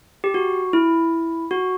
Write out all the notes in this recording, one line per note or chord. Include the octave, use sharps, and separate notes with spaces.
G4
F#4
E4
F#4